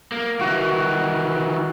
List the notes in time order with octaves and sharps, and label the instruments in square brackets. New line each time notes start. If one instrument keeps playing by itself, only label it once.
[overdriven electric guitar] A#3
[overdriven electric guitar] D#3 E3 [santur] F#4